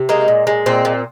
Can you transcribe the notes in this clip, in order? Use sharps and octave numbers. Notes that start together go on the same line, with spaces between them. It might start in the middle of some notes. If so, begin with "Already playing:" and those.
Already playing: C3
G#3 A#3 D#4
A#2
G#3
A#2 C4
A#2